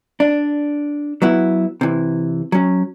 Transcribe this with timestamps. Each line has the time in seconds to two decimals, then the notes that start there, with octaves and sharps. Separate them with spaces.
0.20 D4
1.22 F#3 B3 E4
1.81 C3 E3
2.52 F#3 C#4